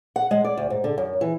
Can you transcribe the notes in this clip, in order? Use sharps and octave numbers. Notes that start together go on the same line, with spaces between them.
F#5
G#3
D5
D2
G#2
D3
F#2
E3